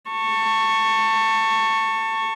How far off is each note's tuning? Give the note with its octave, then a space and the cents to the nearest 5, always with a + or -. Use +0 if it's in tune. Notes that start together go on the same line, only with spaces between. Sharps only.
A5 +25 C#6 -5